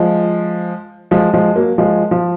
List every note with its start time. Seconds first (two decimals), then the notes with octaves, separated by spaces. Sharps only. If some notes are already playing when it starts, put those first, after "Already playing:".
Already playing: F3 G#3
1.11 F3 G#3
1.34 F3 G#3
1.55 F#3 A#3
1.78 F3 G#3
2.11 F3